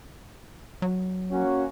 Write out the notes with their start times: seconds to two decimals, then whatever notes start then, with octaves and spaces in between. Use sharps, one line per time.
0.82 F#3
1.31 A#3 C#4 F#4